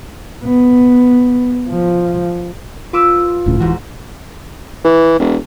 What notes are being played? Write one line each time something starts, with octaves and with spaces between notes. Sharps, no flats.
B3
F3
F4 B4 D6 E6
E1 A2 C#3
D1 G#2 E3 F#4
E3
E1